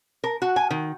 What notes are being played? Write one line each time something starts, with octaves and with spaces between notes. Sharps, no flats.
A#4
F#4
G#5
D#3